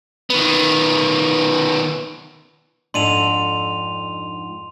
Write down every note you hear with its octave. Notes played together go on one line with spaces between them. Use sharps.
D#3 B3
F2 G#2 D4 C6 D#7 F7